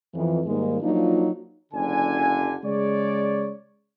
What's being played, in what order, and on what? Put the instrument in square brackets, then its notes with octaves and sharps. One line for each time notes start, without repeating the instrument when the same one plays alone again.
[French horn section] F2 E3
G#2 D#3 G3 G#3 A#3
F3 F#3 A#3 D4 D#4 F4
[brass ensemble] F#1 D3 G#5
C#3 G#3 C#5 D5